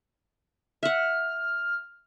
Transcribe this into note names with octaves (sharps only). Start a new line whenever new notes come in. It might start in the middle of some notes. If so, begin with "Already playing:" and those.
E5 F#5 F6